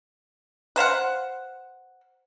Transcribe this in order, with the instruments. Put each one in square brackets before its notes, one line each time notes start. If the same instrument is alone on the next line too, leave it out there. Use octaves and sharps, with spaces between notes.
[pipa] B4 C5 F5 F#5